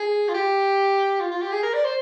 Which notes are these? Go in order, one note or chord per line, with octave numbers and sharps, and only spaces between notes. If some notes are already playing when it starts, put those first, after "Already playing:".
Already playing: G#4
F4
G4
F4
F4
G4
G#4
A#4
D5
C5